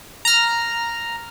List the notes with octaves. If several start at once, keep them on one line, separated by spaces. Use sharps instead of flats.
A#5 F6